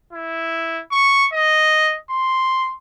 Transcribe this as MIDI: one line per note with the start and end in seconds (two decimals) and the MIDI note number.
0.13 0.81 64
0.91 1.26 85
1.33 1.97 75
2.10 2.74 84